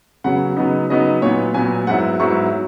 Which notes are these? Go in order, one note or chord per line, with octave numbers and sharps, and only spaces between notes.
C#3 F#3 B3 F#5
C#3 F#3 B3 D#4
C#3 F#3 B3 D#4 D#5
A#2 F#3 B3 C#5
A#2 F#3 B3 G#5
G#2 F#3 B3 E4 F#5
G#2 F#3 B3 E4 C#6
F#3